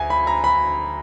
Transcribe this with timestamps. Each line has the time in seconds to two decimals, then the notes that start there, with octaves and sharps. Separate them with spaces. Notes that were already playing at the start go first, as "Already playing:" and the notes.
Already playing: D2 G#5
0.10 B5
0.27 A#5
0.44 B5